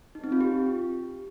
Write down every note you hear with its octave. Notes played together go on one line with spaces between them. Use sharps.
D#4
C4
F4
G4